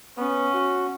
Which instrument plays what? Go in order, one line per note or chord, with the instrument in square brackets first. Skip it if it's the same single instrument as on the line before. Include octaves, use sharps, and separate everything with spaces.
[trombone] B3 [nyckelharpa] C#4
[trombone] F#4